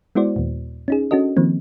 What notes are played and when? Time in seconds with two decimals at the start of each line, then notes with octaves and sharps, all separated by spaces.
0.15 G#3 B3 E4 F#4 C5 D5
0.36 D#2 A#2
0.88 C#4 D#4 G#4
1.11 C#4 D4 F#4 A4 D#5
1.37 D#3 F3 A#3 C4